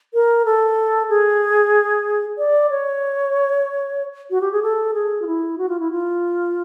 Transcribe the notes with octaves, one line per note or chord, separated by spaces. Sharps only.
A#4
A4
G#4
D5
C#5
F#4
G4
G#4
A4
G#4
F4
E4
F#4
F4
E4
F4